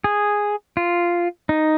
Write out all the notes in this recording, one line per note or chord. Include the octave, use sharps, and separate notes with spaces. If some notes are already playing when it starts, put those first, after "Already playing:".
G#4
F4
D#4